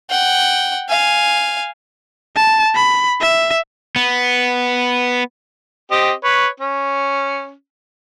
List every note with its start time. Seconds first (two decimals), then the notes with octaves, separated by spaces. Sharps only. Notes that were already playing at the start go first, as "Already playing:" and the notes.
0.10 F#5 G5
0.89 F5 G#5
2.36 A5
2.75 B5
3.21 E5
3.96 B3
5.91 C4 G4 D#5
6.24 B4 C#5
6.60 C#4